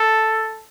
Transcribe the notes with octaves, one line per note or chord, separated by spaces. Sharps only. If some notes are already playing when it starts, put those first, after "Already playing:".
Already playing: A4